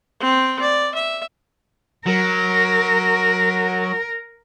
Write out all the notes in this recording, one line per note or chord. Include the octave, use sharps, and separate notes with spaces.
C4 G5
D5
E5
F#3 A#4